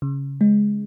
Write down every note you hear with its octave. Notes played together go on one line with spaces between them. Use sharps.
C#3
G#3